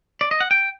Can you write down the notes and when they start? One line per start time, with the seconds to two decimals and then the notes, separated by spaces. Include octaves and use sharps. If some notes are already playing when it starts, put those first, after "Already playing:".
0.21 D5
0.31 D#5
0.40 F#5
0.51 G5